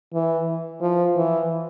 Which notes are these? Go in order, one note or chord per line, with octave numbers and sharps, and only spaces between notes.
E3
F3
E3